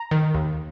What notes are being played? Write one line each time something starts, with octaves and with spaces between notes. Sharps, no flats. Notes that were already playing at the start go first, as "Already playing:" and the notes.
Already playing: A#5
D#3
D#2